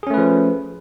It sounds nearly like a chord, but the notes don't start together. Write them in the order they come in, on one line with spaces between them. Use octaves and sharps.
G#4 C#4 A3 B4 F3